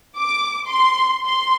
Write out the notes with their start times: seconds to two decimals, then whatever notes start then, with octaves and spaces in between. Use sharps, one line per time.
0.17 D6
0.68 C6
1.24 C6